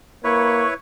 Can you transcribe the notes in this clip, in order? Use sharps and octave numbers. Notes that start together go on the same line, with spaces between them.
A#3 E4 B4 C#5 C#6